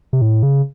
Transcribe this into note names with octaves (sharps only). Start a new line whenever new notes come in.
C3
A2
C#3